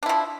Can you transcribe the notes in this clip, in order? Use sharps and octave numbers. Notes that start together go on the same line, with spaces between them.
F3 D4 E4